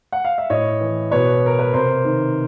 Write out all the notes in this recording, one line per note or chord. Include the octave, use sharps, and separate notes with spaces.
F#5
F5
E5
A2 C#5 D#5
E3
B2 B4 C#5
A#4
B4
C3 A#4 C5
D#3